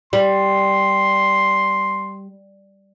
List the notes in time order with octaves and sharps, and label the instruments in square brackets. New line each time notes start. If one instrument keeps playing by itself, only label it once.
[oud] G3 [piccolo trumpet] C6